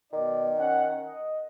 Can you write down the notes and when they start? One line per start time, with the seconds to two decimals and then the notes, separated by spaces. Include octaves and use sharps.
0.13 B2 D#3 D#4 D5
0.58 C#4 F#5
1.05 D#5